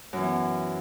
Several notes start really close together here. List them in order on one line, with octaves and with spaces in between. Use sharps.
F#2 E3 B3